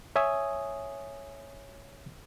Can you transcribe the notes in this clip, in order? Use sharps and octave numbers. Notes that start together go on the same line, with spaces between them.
C#5 E5 G#5 D#6